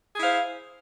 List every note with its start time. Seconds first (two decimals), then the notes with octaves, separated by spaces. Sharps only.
0.15 G#4
0.18 E4
0.21 F5
0.24 C5